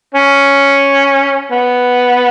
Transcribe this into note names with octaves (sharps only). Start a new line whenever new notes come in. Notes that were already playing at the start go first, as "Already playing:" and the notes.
C#4
B3